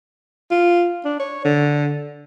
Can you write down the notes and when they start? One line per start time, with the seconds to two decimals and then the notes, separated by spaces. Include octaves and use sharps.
0.51 F4
1.05 D4
1.19 C#5
1.45 D3